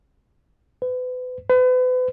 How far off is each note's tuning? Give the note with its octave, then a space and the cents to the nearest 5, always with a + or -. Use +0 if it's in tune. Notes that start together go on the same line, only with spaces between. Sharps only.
B4 +35
B4 +40